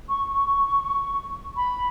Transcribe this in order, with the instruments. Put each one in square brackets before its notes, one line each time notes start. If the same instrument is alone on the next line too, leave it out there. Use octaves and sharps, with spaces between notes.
[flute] C#6
C#6
B5